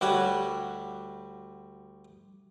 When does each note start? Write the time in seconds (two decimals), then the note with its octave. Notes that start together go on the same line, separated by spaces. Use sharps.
0.01 D2 G3 F#4 C#5